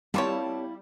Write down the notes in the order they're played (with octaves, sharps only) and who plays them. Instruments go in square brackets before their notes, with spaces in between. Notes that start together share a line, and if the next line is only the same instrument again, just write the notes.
[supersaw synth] G3 [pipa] A#3 F4 C#5 [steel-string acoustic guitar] C4 A5 [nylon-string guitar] E4 F5